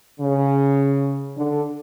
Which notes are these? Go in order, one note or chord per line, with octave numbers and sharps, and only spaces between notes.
C#3
D3